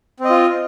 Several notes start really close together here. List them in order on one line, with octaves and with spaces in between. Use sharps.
C4 D#5 F4